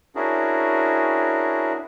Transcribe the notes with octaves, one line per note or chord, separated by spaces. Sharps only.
C#4 D4 E4 F#4 G#4 A#4